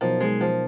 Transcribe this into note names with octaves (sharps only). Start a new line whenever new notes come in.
B2 F3 F#3 B3 D#4 A#4
G#3
F3